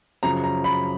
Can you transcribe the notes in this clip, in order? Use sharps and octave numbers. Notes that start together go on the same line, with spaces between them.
F#2 C#3 F3 A#5
A#5
B5